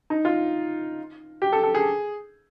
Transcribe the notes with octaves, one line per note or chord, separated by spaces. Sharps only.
D#4
F4
G4
A4
A4
G#4